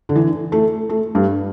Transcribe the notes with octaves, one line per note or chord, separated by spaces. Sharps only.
D3
E3
A3
A3
G2